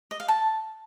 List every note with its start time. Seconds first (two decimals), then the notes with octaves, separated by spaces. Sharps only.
0.11 D#5
0.20 F5
0.28 A5